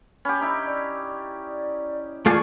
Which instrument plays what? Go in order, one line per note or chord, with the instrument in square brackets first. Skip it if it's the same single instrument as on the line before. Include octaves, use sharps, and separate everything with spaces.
[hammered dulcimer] C#4 G4 [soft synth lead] B5
[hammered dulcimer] D#4 E4
[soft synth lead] D5
[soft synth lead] E3 [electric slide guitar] A3 F4 G#4 [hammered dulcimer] D5 G#5 C#6